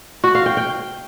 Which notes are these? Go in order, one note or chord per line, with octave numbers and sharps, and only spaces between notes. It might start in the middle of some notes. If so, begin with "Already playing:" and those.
F#4
F5
G5
G5